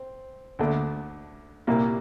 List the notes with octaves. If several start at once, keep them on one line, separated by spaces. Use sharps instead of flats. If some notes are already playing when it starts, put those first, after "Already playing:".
Already playing: C4
D2 D3 A3 D4
C2 A#2 G3 A#3 E4